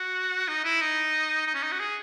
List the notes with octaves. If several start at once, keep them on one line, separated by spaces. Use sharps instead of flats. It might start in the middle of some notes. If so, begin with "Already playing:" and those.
Already playing: F#4
D#4
E4
D#4
D#4
C#4
D#4
F#4
G#4